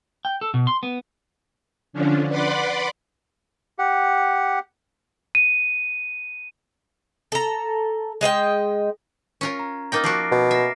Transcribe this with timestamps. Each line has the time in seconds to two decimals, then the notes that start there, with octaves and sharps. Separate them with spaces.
0.25 G5
0.41 A4
0.54 B2
0.67 C6
0.83 B3
1.93 D3 F3 C#4 D4
2.28 B4 D5 F#5 B5 C6 D6
3.79 G4 F#5
5.35 D#7
7.32 A4 A#5
8.21 G#3 D#5 F#5 G5
9.41 C#4 F4 A#4
9.59 A#5
9.92 A#3 D#4 G5 F6 A6 A#6
10.04 F3 A#3 F#4 D6 C7 D7
10.31 B2
10.51 E5 A#6 C7